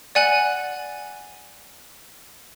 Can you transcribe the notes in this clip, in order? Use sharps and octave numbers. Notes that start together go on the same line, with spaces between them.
D5 F#5 G#5 F#6 F#7